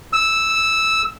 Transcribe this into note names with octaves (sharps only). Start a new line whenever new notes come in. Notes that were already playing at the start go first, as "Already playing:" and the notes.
E6